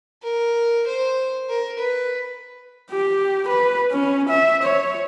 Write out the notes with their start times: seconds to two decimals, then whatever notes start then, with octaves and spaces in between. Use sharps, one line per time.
0.23 A#4
0.87 C5
1.49 A#4
1.78 B4
2.91 G4
3.48 B4
3.91 C#4
4.29 E5
4.63 C#5